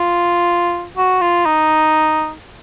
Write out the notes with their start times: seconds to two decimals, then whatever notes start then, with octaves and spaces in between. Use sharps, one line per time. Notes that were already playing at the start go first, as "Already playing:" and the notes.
Already playing: F4
0.97 F#4
1.21 F4
1.46 D#4